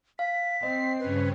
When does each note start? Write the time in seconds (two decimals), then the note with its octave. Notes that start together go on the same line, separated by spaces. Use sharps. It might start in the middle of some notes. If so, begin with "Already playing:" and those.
0.19 F5 B6
0.63 C4 D#5 C7
0.99 G2 C#3 C#4 B4